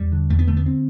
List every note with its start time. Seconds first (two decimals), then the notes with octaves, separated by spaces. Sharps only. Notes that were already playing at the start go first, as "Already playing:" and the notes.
Already playing: E2 G3
0.12 D3
0.30 E2 A3
0.39 B3
0.48 D3 A3
0.57 B3
0.66 C4